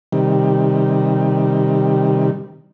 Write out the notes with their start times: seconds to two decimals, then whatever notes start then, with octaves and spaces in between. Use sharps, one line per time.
0.13 C3 D#3 G3